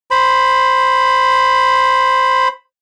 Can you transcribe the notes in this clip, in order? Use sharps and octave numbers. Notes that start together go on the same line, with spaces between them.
C5 B5